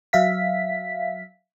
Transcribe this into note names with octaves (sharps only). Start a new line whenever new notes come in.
F#3 E5 F5 B6